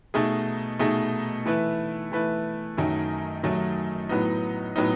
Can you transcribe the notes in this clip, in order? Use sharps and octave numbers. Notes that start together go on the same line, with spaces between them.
B2 A3 D#4 G#4
B2 A3 D#4 G#4
E3 A3 E4 B4
E3 A3 E4 B4
F#2 D#3 F#3 A3 D#4
F#2 D#3 F#3 A3 D#4
A2 F#3 B3 D#4
A2 F#3 B3 D#4